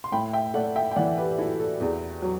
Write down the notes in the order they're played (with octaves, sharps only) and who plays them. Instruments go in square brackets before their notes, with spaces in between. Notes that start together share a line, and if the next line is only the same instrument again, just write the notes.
[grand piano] C6
[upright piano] A2 [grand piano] G5 B5
[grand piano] E5 G5
[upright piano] A3 [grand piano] D5 F#5
[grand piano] E5 G5
G5
[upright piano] E3 [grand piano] D5 F#5
[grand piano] G4 B4
[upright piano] E4 [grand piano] F#4 A4
[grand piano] F#4 A4
[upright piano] E2
F#3